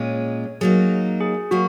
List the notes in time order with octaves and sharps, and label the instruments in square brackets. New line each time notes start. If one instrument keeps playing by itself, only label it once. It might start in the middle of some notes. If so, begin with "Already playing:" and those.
Already playing: [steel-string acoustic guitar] A#2 G#3 C#4 [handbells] C#5
[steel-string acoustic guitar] F#3 A#3 D#4 [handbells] G#4
[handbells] G#4
[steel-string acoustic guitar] F#3 A#3 [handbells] F#4